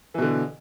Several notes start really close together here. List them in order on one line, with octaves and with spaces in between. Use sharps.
E3 B2 D3